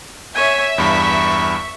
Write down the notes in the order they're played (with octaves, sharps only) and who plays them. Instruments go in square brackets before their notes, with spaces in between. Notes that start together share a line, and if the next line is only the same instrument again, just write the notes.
[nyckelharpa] C#5 G#5 [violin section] E5
[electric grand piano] E2 G2 [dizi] B5 [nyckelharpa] C#6